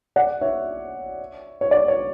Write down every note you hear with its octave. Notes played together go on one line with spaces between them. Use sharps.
D5 F#5
C#5 E5
C#5
D5
C#5